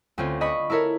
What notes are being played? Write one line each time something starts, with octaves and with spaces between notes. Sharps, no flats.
D2 C4 C#4 F4
D4 D#5 B5 C#6
E4 A4 A#4 C#5 E5